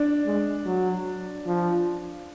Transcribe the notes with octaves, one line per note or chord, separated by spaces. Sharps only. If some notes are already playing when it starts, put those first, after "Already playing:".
Already playing: D4
G#3
F#3
F3